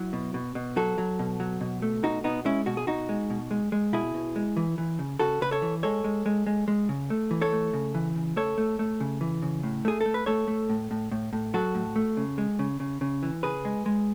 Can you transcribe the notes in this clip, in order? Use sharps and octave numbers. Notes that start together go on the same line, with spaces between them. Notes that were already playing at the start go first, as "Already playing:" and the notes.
Already playing: F#3 E4
B2
B2
B2
F#3 F#4 A4
F#3
B2
F#3
B2
A3
B2 D#4 F#4
B2 B3 D#4
G#3 C#4 E4
B2 F#4
G#4
B2 D#4 F#4
G#3
B2
G#3
G#3
B2 E4 G#4
B2
G#3
E3
E3
C#3
C#3 F#4 A4
C#3 B4
A4 C#5
E3
G#3 A4 C#5
G#3
G#3
G#3
G#3
C#3
A3
E3
A4 C#5
A3
C#3
E3
C#3
A3 A4 C#5
A3
A3
C#3
E3
C#3
A2
A3 G#4
A4
A3
B4
A3 A4 C#5
A3
A2
A2
A2
A2
F#3 F#4 A4
A2
A3
C#3
G#3
C#3
C#3
C#3
E3
C#3 G#4 B4
G#3
G#3